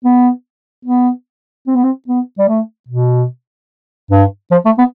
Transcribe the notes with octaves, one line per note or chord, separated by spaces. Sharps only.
B3
B3
C4
B3
C4
B3
G3
A3
B2
G2
F3
A3
B3